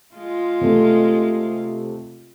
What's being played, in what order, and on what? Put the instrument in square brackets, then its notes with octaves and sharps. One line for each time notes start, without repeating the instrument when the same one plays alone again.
[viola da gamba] G#3 F4
[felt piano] C3 A3